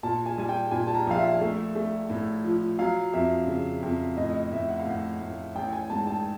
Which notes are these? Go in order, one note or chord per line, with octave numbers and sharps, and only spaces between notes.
A#2 A5
G#5
G3 G#5
G5
A#2 G#5
A5
A#5
A#1 F5
E5
A3
A3
A2
F3
F#3 F5
F2 E5
C#3
F2
A2 D#5
D#5
A2 E5
F#5
F5
A2 F#5
A2
A1 G5
G#5
G#2 A5
A5